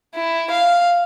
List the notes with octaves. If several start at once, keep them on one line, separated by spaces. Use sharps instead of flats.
E4
F5